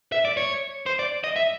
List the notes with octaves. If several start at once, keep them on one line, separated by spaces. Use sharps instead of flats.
E5
D5
C#5
C5
D5
D#5
E5